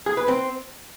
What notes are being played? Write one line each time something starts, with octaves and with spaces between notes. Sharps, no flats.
G#4
B4
C4